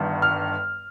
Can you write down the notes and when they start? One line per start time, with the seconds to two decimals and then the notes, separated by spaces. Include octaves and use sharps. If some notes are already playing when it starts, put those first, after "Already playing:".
Already playing: G1 G2 D#3
0.22 F6